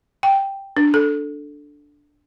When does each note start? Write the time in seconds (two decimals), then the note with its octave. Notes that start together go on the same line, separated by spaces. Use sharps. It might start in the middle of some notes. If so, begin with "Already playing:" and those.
0.23 G5
0.77 D4
0.94 A4